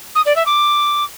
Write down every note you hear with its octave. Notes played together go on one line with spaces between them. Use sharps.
D#6
D5
E5
D6